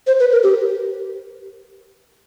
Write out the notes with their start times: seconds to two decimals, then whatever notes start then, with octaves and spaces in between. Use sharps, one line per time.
0.07 C5
0.20 B4
0.32 A#4
0.43 G4